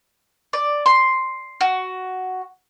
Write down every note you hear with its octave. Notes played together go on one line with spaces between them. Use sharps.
D5
C6
F#4